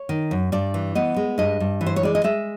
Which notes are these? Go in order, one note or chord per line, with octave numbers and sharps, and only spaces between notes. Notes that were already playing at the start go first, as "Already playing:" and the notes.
Already playing: C#5
D#3
F#2
G2 D5
E3
B3 D#5
G#3
G2 D#5
G2
E3
C5
C#5
G#3 D5
D#5
G#3 E5